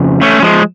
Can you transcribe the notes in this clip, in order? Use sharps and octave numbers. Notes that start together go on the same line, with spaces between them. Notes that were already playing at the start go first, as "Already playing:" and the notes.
Already playing: F2 C#3 F3
A3 C#4
F3 G#3